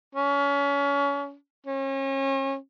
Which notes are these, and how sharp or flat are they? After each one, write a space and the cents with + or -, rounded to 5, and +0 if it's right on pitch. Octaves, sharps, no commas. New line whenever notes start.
C#4 +30
C#4 -35